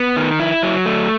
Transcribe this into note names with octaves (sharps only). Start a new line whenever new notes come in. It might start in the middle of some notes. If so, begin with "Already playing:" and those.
Already playing: B3
D#3
E4
F#3
A3